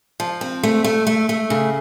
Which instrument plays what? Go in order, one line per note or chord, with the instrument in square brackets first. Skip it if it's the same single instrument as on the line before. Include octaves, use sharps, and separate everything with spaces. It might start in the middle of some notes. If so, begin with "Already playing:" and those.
[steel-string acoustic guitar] F3
C4
A3
A3
A3
A3
C#3